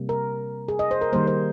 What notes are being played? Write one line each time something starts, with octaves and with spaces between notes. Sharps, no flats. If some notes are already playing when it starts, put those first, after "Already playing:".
Already playing: C3 G3 A#3
A#4
G#4
D#5
C5
A#4
D#3 G3 A#3 C5
C5